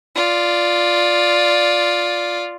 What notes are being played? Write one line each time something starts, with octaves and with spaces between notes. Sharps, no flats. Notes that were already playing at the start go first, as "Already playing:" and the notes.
F4 D5